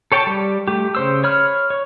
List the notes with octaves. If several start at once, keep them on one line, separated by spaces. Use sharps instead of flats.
A4 C#5 G5 A5
G3
A3 G4
C#3 C5 E6
C#5 B5 F6
C#5